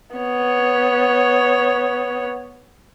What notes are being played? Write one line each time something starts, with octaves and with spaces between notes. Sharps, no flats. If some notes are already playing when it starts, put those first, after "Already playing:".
B3 C#5